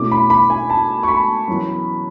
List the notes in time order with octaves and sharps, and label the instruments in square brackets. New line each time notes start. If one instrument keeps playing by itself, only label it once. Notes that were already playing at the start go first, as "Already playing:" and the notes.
Already playing: [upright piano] B2 A3 C#4 E4 D6
B5
B5
G#5
A5
C#6
B5
F#2 E3 B3